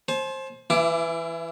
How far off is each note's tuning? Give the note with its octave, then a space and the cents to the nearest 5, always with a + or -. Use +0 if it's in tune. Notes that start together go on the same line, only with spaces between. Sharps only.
C5 +20 A5 -45
E3 +10 E4 +45 D6 +0